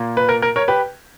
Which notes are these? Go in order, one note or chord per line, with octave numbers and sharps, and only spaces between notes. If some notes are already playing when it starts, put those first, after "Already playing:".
Already playing: A#2 A#3
B4
A#4
A#4
A#4 C#5
G4 B4